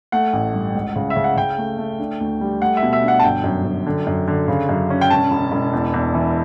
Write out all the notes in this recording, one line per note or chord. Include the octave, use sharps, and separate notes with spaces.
A3 F#5
A1
G2
C#2
C#3
E5
C#3
F#5
C#3 G5
A3
A3
D4
D2
G3
A3 F#5
E5
B2
E5
D4 F#5
A5
G1 G5
F#2
F#2
D3
F#2
D3
C#3
F#2
C#4
G5
E1 A5
E1
E1
E2
E2
E3